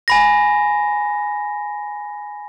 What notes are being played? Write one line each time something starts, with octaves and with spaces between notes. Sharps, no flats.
G#5 B5 A#6